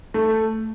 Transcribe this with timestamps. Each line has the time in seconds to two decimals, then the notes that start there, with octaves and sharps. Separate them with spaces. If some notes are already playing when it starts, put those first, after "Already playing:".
0.14 A3